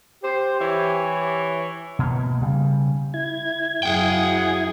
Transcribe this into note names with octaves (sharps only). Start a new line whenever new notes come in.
G4 C5
E3 C#5
B2 A#3
C#3 G3
E4 G#6
F#2 G#4 F#5 G5